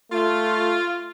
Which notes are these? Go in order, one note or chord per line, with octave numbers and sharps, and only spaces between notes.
A3 F4